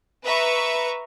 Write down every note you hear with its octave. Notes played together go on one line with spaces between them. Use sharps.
B4 E5 A#5 C#6